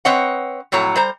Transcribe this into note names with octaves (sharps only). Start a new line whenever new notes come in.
C4 B4 C#5 D#5 F#5
F2 A2 F#3 C#5 A#5
G3 C5 A#5